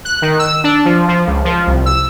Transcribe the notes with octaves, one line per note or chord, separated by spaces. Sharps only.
F#6
D#3
E6
D4
F3
F3
C#2
F3
C2
E6